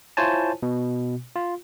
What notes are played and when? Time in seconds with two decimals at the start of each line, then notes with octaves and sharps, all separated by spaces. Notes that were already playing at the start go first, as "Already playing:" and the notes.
0.17 E4 F4 C5 C#5 G#5 A5
0.63 B2
1.36 F4